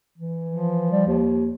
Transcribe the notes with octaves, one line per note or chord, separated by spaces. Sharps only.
E3
F3
G3
D#2